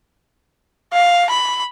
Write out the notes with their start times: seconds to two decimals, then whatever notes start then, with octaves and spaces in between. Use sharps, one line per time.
0.93 F5
1.30 B5